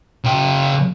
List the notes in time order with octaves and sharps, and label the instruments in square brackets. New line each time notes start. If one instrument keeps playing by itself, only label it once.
[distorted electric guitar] C#3 G5